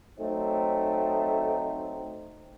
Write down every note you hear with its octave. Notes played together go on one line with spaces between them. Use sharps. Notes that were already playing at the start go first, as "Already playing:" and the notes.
F#3 A3 C4 D#4